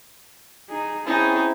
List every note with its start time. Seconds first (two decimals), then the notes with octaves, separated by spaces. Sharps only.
0.69 D#4 G#4
1.06 C4 C#4 D#4 E4 G#4 A5